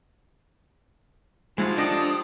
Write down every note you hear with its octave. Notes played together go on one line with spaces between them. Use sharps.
F3 G#3 D#4 E4 F#4
D4 G4 A4 D#5 D#6